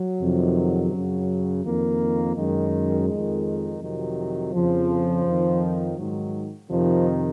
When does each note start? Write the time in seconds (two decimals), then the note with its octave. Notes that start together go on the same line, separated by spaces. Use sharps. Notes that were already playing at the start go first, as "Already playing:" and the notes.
Already playing: F#3
0.20 F2 C3 D#3
0.91 F#2 C#3
1.64 F2 D#3 A#3
2.36 F#2 D#3 G#3
3.09 F2 D#3
3.81 F2 C3 D#3 F#3
4.53 F2 C#3 F3
5.25 F2 D#3
5.97 G#2 D#3 F#3
6.70 F2 C3 D#3 F3